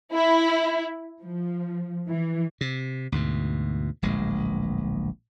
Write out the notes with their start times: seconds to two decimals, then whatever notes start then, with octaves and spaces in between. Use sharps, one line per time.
0.13 E4
1.23 F3
2.07 E3
2.61 C3
3.12 D2 G#2 B2
4.02 D1 A#1 G#3